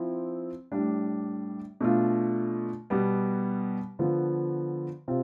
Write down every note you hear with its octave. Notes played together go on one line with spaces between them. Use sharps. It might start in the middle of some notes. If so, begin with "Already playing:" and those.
Already playing: F3 C4 E4
A2 G3 D4
B2 A3 D4 F4
B2 G3 B3
D3 F3 B3 F4
C3 C4 F4